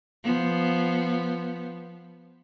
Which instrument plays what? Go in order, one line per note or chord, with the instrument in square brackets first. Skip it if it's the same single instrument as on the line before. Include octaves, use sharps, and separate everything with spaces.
[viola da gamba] F3 B3